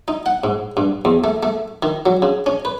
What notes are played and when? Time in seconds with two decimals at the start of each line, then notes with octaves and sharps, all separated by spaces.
0.08 D#4
0.26 F#5
0.44 G#2
0.77 G2
1.05 E2
1.24 A3
1.43 A3
1.83 D#3
2.06 F#3
2.22 C#3
2.46 C#4
2.65 B4